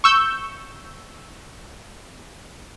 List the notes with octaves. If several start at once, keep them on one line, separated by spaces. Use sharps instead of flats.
C#6 E6 G6